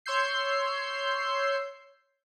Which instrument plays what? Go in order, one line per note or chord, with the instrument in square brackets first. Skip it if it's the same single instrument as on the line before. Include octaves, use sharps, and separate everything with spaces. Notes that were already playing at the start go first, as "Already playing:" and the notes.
[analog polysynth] C#5 C6 E6 G6 C7